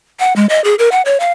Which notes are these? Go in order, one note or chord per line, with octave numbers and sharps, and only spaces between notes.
F#5
G#3
D#5
G#4
A#4
F#5
C#5
F5